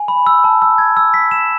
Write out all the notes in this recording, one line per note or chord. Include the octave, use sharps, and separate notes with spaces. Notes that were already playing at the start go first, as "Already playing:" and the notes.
Already playing: G#5
B5
E6
A5
E6
G#6
E6
B6
E7